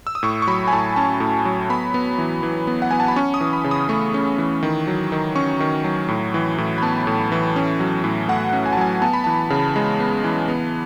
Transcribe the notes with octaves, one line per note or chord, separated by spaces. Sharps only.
E6
D#6
A2 C#6
C#6
F#3 B5
G#5
A2 A5
C#4 A5
A2
F#3
B3 B5
B3
E3
E3
B3
F#5
B3 G#5
A5
B5
C#4 C#6
D#6
E3
B5
C#3
D#6
A3 C#6
C#4
E3
D#3
F#3
D#3
C#4 C#6
D#3
F#3
A2
E3
A2
B5
B3 A5
A2
E3
C#4
F#3
A2
A3 F#5
C#4
G#5
A5
F#3 G#5
B3 A5
B5
E3 A5
C#3
G#3
B3
E3
B3